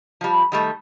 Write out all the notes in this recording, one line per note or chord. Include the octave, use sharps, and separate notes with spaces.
F3 G3
D#3 G3 A3